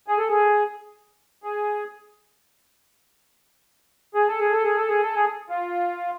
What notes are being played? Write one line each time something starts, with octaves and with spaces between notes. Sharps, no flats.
G#4
A4
G#4
G#4
G#4
A4
G#4
A4
G#4
A4
G#4
A4
G#4
F4